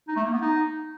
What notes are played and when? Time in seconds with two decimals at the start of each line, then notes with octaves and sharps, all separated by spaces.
0.08 D#4
0.16 A3
0.25 A#3
0.33 B3
0.42 D#4